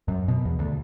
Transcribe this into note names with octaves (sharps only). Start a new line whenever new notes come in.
F#2
B2
E2
D2